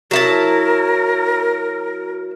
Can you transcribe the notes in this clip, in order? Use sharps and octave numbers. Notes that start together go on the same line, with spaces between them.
F#3 E4 A#4 A5